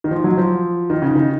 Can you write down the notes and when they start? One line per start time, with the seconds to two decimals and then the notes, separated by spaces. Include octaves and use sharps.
0.04 D#3
0.11 F3
0.24 F#3
0.37 F3
0.90 D#3
1.02 C#3
1.15 D#3